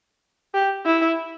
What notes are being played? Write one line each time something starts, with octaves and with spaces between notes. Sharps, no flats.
G4
E4